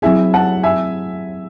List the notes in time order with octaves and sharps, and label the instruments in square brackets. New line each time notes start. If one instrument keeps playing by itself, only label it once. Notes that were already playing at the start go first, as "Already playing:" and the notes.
[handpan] F#3 C4 E4 G#4 [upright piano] E5 G#5
[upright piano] F#5 A5
E5 G#5